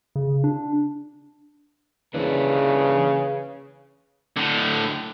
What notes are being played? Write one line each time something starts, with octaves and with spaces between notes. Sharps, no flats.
C#3
D4
C#3 E3 A#3 D4 B4
A2 D3